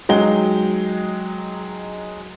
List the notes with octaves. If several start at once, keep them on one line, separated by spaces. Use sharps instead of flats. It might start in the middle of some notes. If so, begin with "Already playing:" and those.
F#3 G#3 D#4 G5 G7